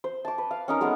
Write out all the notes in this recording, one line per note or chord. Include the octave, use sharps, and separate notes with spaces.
C5
A5 D6
B4
F5
C#4 D#4 A#4
G#3 A3 B3 A#4